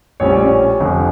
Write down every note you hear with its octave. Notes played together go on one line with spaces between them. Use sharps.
A#1 A2 G3 C#4 C#5
D5
C#4 C#5
F1 F2 D3